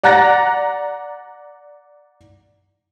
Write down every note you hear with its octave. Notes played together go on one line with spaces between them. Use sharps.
D5 F#5 A#5 F#6 A6 A#6